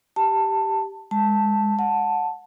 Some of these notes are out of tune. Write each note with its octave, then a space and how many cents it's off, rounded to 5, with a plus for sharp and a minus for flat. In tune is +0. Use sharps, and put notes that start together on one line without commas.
G4 +0 A5 +15
G#3 -10 A5 +0
F#5 -15 A5 +0